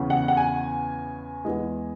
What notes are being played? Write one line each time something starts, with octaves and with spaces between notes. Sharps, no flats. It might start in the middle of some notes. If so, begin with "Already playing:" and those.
Already playing: E2 C#3 E3 C#4
F#5
F#5
G#5
E2 E3 G#3